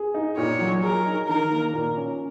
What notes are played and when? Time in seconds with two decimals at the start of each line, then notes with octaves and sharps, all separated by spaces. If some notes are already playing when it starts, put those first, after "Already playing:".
Already playing: G#4
0.14 D#4
0.37 A#2 C#5
0.60 F#3
0.82 G#4 A#4
1.06 D#4
1.29 D#3 A#4
1.52 A#3
1.73 A#2
1.97 C#4